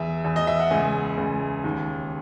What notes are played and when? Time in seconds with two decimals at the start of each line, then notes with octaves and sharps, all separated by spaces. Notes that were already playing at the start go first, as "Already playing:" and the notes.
Already playing: E2 E5
0.24 E2
0.36 D#5
0.47 E5
0.60 F#5
0.70 C#2 G#5
1.18 C#2
1.64 D#2